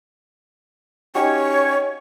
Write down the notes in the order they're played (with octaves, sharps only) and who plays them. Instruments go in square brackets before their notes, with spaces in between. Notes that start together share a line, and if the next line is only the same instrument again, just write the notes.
[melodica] C#4 C#6 [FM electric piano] D#4 F#4 G4 [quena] C#5